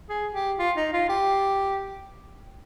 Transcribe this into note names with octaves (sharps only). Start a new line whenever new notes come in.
G#4
G4
F4
D#4
F4
G4